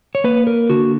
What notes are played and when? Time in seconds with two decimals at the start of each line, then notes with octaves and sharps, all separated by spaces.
0.15 C#5
0.24 A#3 B4
0.47 A#4
0.70 D3 F#4